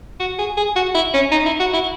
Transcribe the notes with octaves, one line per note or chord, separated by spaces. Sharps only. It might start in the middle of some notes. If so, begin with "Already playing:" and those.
F#4
G#4
G#4
F#4
E4
C#4
D#4
E4
F#4
E4